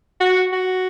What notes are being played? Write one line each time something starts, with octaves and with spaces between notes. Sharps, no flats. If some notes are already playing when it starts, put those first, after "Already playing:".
F#4
F#4